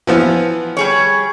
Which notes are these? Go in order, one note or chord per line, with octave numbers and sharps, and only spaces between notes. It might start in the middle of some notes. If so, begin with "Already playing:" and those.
E3 F3 B3
G3 G#4 C#5